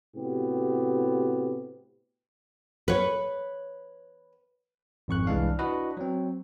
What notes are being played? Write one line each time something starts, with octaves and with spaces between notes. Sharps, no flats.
A2 C3 B3 F#4 G4
B4 C#5
G#1 F2 C#6 F#6
C2 E3 G#3 D4 F5
D4 E4 F#4 B4 D#5
F#3 C4